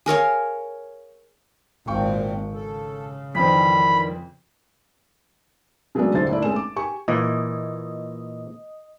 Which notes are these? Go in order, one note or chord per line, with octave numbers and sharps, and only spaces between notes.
G#4 A#4 C#5 F5
G#1 A#2 C4 F5 G5 C#6
C#3 A4
F2 D#3 E3 G3 C4 B5
C#3 F#3 G#3 A3 B3 D4
D#1 D3 G3 C5 E5 A6
G1 A3 E4 D5
G#3 A3 C4 C#4 E7
D6
G4 G#5 C#6
A#2 E3 D#5